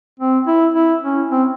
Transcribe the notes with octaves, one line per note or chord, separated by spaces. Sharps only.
C4
E4
E4
C#4
C4